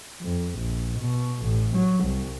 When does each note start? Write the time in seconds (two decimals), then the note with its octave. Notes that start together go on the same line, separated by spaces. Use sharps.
0.22 F2
0.59 A#1
0.99 B2
1.43 A1
1.75 F#3
2.04 C2